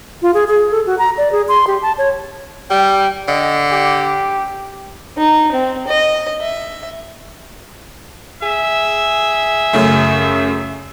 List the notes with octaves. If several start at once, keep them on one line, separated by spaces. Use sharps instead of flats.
F4
G#4
G#4
A4
F#4
A#5
D5
G#4
C6
G4
A5
C#5
G3 G5
D3 D#5
G4
D#4
C4
D#5
E5
G#4 E5
F#2 C#3 A3